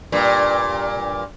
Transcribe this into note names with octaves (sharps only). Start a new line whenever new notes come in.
G2 A#2